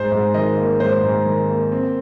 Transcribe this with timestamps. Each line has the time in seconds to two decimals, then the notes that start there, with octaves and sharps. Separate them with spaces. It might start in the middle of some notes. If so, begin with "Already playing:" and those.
Already playing: G#2 C5
0.12 G#2
0.34 D#3 D#5
0.58 A#3
0.80 G#2 C5
1.03 G#2
1.26 D#3
1.49 A#3
1.72 C4